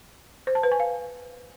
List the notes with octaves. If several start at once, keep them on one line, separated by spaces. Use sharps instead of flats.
C5
A5
B4
G#5
F5